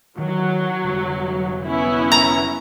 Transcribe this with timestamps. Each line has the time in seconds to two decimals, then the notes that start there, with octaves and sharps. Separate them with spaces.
0.18 D#3 E3 F#3
0.85 F1 D3 G3
1.65 B3 C#4 E4
2.12 A#5